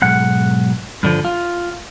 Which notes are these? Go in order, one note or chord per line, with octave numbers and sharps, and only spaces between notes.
B1 G#2 F#5
G2 D3 F3
F4